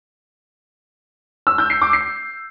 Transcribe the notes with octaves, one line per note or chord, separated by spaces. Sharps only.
E6
G6
C7
D6
C7